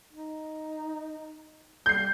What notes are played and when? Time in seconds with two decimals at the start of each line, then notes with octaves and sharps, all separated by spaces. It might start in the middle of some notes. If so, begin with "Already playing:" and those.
0.13 D#4
1.86 G3 G6 C7